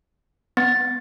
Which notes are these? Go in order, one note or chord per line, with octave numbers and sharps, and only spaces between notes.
B3 A6